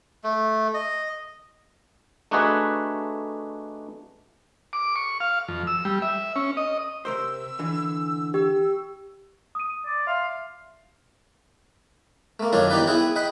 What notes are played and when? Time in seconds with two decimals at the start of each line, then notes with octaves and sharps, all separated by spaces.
0.24 A3
0.74 D#5
2.31 A3 D4 D#4 F#4 G#4 B4
4.73 D6
4.96 C#6
5.20 F5
5.48 F2
5.67 E6
5.85 G3
6.02 E5
6.36 C#4
6.57 D#5
7.05 C3 A#4 C5 E6
7.59 D3 E3
8.34 G4 E6
9.55 D#6 D#7
9.85 D5
10.07 E5 F5 C6
12.40 A3 A#3
12.53 F#2 D#3 D4 F4 C#5 F5
12.70 E3 B3 D#4 G4 B4 D5
12.87 B3 E4 G#4 F#5 G5
13.16 D#5 F#5 G5 B5